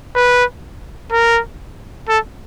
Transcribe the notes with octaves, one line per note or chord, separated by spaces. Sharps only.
B4
A#4
A4